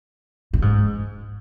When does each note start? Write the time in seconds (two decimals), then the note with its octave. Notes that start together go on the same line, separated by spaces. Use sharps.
0.53 A2
0.62 G#2